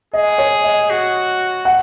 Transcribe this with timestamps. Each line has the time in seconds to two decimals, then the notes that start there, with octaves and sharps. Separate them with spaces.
0.14 G#4 D#5
0.38 C#5
0.64 D#5
0.90 F#4
1.65 F#5